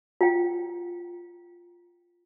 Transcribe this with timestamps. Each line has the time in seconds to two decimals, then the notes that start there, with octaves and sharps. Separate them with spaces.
0.21 F4 G5